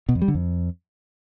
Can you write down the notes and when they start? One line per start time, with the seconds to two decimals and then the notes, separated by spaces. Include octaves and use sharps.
0.09 B2
0.15 F2
0.22 G3
0.28 D3
0.35 F2